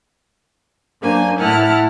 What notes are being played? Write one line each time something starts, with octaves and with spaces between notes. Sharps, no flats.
F#2 A#3 D4 C5 G#5
A2 E4 F#5 A5 F6